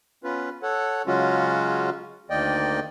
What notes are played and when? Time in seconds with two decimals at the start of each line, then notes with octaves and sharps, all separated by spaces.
0.24 B3 C#4 F4 B4
0.63 A4 C#5 F#5
1.07 C#3 F#3 G#3 C#4 F4 F#4
2.30 D2 D#3 A#3 D5 D#5 G5